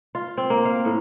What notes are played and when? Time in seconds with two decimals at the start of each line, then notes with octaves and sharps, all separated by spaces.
0.15 F4
0.37 C4
0.50 A#3
0.65 F5
0.85 A2